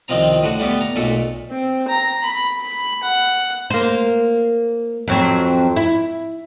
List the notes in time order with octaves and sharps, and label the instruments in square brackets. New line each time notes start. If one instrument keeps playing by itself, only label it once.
[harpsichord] C2 D#3 F3 C4 A#5
A2 D3 F#4
G3 A3 B3 G4
A#5
B1 A#2 A3 E5 C#6
[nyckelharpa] C4
A#5
B5
B5
F#5
[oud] A#3 C5
F2 F#3 C4
E4